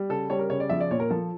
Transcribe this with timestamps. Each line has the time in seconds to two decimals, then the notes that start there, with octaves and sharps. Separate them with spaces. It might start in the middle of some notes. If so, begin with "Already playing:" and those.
Already playing: G3
0.09 C#3 A4
0.30 G3 C#5
0.39 A#4
0.50 C#3 C#5
0.60 D5
0.70 F3 E5
0.80 D5
0.91 A#2 C#5
1.00 A#4
1.10 F3 A4